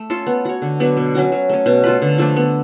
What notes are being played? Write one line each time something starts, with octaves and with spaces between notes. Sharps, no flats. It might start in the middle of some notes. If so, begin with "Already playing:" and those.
Already playing: A3
C#4 F4 A4
B3
F#4 C#5
D3
F#3 B3 D4
B2
F#3 C#4 F#4
F#3
A3 C#4
B2
A3 F4 B4
D3
F3 A3 D4
B3